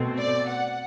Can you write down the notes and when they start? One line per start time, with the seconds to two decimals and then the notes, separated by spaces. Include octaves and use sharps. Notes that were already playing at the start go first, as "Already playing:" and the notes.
Already playing: B2 A3 C4
0.19 D5
0.50 F#5